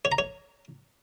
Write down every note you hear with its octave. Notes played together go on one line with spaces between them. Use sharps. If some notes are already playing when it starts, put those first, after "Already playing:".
C#5
A#5
C#5